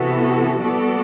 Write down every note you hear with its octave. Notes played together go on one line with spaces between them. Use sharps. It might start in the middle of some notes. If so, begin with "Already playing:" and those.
Already playing: C3 E3 B3 F#4 A4
G3 B3 F#4 A4 D5